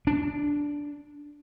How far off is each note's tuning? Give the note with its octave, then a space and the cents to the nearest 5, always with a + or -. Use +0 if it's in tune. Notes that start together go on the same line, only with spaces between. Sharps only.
D4 -10